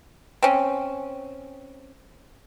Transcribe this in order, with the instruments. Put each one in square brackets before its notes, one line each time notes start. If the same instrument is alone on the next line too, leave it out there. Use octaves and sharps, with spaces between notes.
[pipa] C4 C#4